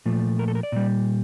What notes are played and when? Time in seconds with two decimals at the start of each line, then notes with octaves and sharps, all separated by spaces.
0.06 A#2 F3 A3
0.39 A#4
0.48 A4
0.55 A#4
0.63 D5
0.72 A#2 G3